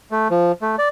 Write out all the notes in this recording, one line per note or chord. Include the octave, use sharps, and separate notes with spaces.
A3
F3
A3
D5